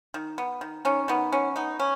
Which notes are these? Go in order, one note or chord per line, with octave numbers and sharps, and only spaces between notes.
D#3
B3
D#3
D#3 C#4
D#3 B3
B3 C#4
B3 D#4
C#4